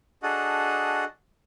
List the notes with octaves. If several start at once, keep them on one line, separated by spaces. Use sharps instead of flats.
D4 F#4 G#4 A4 D#5 F#5